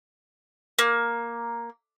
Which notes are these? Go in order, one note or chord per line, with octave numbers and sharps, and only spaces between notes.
A#3